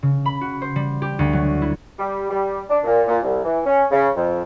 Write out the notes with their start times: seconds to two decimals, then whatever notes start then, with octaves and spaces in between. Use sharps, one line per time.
0.03 C#3
0.26 B5
0.41 F#4
0.62 C5
0.76 G3
1.02 G4
1.19 D2
1.33 F#3
1.62 E4
1.98 G3
2.30 G3
2.68 D4
2.84 A#2
3.07 A#2
3.23 C2
3.43 E3
3.65 C#4
3.91 C#3
4.15 F2